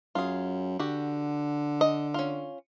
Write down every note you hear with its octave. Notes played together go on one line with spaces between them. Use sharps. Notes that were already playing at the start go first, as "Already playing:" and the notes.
F#2 F4 G#4
D3 F#4 G4
D#5
C#4 F4